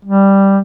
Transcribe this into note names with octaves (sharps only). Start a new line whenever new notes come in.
G3